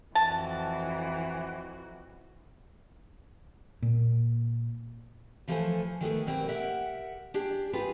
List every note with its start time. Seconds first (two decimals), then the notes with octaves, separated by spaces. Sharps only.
0.15 F2 E3 F#4 A5
3.82 A#2
5.48 E3 F3 A3 A4 C5 G#5
6.01 D#3 A3 B3 G#4
6.27 B2 A#3 C4 G4
6.48 G4 A#4 E5 F#5
7.34 D4 G4 G#4
7.73 F4 G4 G#4 B4